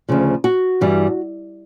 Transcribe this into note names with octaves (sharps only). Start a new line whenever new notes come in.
D2 C#3 F3
F#4
G2 E3 G3